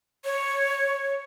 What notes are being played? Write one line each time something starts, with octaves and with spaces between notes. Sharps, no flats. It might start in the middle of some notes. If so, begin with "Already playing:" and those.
C#5